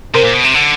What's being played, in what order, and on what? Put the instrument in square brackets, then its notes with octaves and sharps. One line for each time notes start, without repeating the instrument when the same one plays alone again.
[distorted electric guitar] C3 [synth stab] A#4 C5
[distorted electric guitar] A#2
B2
C3
D3